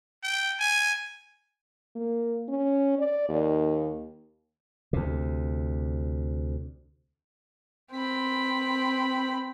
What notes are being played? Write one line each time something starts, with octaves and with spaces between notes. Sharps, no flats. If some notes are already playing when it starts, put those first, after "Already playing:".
G5
G#5
A#3
C#4
D5
D#2
D2 C3
C4 B5